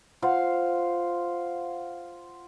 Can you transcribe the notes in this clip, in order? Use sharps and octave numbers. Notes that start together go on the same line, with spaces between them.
F4 C5 F5 F#5